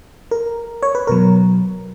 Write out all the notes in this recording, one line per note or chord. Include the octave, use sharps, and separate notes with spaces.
A#4
C#5
B4
B2 F#3 A#4